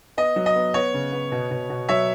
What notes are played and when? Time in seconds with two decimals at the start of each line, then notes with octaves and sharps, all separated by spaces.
0.17 B3 D#5
0.36 F#3
0.46 D#5
0.56 B3
0.74 B3 C#5
0.94 C#3
1.13 B3
1.32 B2
1.51 B2
1.70 B2
1.89 F#3 C#5 E5